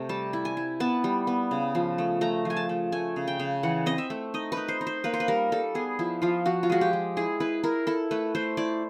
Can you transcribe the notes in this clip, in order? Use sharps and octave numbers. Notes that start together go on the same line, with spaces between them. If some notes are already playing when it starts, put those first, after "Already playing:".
Already playing: C3 A3
G3 A5
E4
G#5
E4
B3 A5
G3
B3
C#3
F3
A3
A3 A#5
F3 G#5
A5
A3
A3 G#5
C#3
G5
C#3
E3 F#5
C4 D#5
E5
A3
D#4 D#5
D#4 B4
C5
D#4
C5
A#3 B4
C5
B4
G3 A#4
G3 A4
B3 G#4
F3 E4
F3 F4
F3 F#4
F4
G#3 F#4
G4
G#3
E4 G#4
E4 B4
E4 A#4
E4 A4
A3 B4
A3 C5
E4 D5